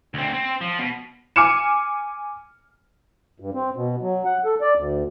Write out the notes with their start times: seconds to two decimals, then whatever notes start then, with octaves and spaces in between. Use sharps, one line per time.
0.14 D2 C4
0.34 C4
0.61 F3
0.79 B2
1.36 G#5 D6 F6 C#7 E7
3.40 G2
3.54 C4
3.76 B2
4.02 F#3
4.26 F#5
4.45 A4
4.61 D5
4.76 D2